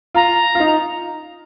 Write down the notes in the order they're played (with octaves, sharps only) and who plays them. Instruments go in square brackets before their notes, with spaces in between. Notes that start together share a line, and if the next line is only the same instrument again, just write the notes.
[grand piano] F4 [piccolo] A#5
[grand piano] F4
D#4